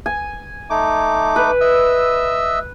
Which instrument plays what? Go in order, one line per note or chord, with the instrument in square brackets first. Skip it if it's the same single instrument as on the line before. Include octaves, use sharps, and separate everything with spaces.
[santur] G#5
[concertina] A3 D#4 D6
[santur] B4
[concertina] D#5 E5 E6